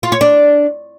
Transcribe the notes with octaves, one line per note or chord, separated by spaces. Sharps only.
F4
C#5
D4